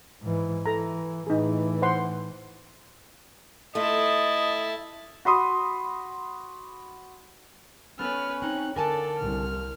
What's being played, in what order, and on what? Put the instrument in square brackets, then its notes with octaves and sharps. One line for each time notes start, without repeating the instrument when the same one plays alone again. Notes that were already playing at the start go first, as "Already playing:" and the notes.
[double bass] G#2 E3
[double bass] E3 [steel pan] A4 A#5
[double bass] A2 E3 [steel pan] D#4 G#4
[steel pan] C5 F#5 C6
[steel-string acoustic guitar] A3 F4 [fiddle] E4 A5 [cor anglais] D#5
[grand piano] F#4 B5 C6 D#6
[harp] B3 A4 [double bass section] C#4 [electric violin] B4 F6
[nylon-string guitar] C4 D#4 [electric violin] F#6
[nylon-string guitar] D3 G#5 A5 [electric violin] A4 D5 [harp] A#4
[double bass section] C2 [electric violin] F6